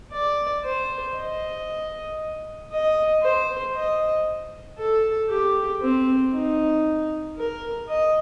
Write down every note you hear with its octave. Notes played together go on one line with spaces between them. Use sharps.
D5
C5
D#5
D#5
C5
D#5
A4
G4
C4
D#4
A#4
D#5